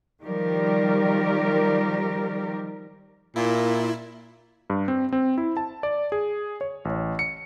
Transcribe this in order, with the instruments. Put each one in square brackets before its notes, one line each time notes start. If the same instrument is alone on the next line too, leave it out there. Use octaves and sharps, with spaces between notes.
[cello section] D#3 F3 G3 G4 A#4 D5
[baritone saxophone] A#2 [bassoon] A#3 [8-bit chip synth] E4
[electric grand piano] G2
C4
C4
E4
A5
D5
G#4
C#5
A1
C#7